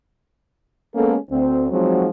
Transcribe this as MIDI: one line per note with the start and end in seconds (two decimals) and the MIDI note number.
0.95 1.16 56
0.95 1.16 58
0.95 1.16 59
0.95 1.16 61
0.95 1.16 69
1.31 1.67 38
1.31 1.67 60
1.71 2.07 53
1.71 2.07 54
1.71 2.07 56
1.71 2.07 60
1.71 2.07 63
1.71 2.07 66